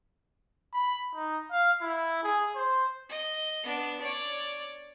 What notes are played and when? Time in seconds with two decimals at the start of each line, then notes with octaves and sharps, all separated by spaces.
0.74 B5
1.14 D#4
1.52 F5
1.81 E4
2.23 G#4
2.55 C5
3.09 D#5
3.63 B3 D4
4.01 C#5 D5